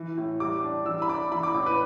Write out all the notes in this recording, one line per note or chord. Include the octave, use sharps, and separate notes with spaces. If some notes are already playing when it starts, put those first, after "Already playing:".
Already playing: E3
A2
G3 D6
D4
E3 E6
B5
D4 D6
E3 B5
D6
A2 D6
B4